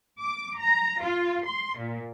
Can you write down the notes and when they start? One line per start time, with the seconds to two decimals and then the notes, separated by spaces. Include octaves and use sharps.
0.22 D6
0.58 A#5
1.02 F4
1.45 C6
1.78 A#2